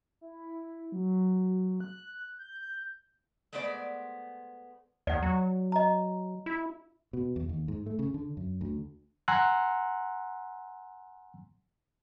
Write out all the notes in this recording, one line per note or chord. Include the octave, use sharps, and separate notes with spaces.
E4
F#3
F#6
G6
G#3 A3 B3 C5 D5
D#2 D5 F#5
F#3
D#5 A#5
E4
B2
E2
D#2
G#2
A3
C#3
D3
F#2
D2
F#5 G#5 A#5 C6 E6 F#6